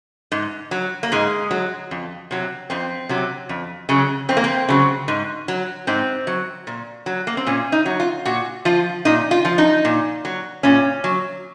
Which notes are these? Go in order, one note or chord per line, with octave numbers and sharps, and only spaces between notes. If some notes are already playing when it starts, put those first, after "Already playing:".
G#2
F#3
A#3
G#2 G#3
F#3
F2
C3 F#3
F2 C4
C3 F#3
F2
C#3 F#3
F2 C4
A#3
C4
C#3 F#3
G#2
F#3
G#2 C4
F#3
A#2
F#3
A#3
C4
A#2 C#4
D#4
F#3
F4
A#2 F#4
F3 F4
A#2 D#4
F4
F3
D#4
A#2
F#3
A#2 C#4
F#3